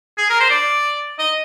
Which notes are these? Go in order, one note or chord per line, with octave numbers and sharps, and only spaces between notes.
G#4
A#4
C5
D5
D#5